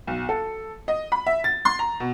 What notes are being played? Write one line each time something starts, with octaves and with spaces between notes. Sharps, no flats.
B1
A4
D#5
B5
E5
A6
C6
A#5
B2